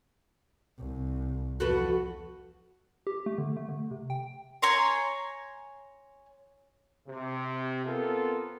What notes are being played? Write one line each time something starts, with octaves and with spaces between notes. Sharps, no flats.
C2
E2 F3 F#4 A4 B4
G4
A3
D3
A3
D3
C3
G5
C#5 G#5 A#5 C6
C3
B3 C4 F4 A4 A#4